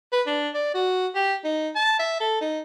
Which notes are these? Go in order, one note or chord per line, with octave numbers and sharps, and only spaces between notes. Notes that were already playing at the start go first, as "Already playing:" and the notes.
B4
D4
D5
F#4
G4
D#4
A5
E5
A4
D#4